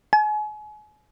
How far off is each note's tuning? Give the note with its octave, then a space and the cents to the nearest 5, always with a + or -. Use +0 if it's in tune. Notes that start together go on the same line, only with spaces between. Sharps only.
G#5 +35